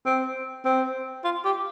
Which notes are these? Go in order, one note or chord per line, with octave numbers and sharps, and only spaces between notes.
C4
C4
F4
G4